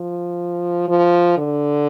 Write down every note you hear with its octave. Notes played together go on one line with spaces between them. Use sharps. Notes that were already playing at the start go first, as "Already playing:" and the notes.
Already playing: F3
F3
D3